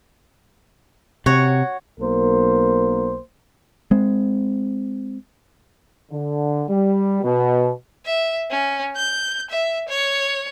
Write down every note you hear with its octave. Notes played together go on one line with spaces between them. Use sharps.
C3 F#4 C#5
B1 A#3 A#4 C5
G#3 C4
D3
G3
B2
E5
C#4
G6
E5
C#5